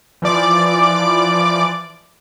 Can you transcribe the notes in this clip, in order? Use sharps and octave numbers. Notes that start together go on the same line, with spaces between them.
E3 F3 D5 D6